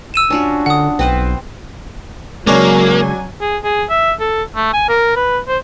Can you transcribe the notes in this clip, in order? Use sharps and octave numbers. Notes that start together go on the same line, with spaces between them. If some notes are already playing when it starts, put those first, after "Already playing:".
E6 D#7 E7
C#4 D4 F4 F#4
D3 F#5 D#6
B1 C4 B4 C5
C#3 F#3 G#3 A#3 C#4 D4 G#5
G#4
G#4
E5
A4
A3
G#5
A#4
B4
C5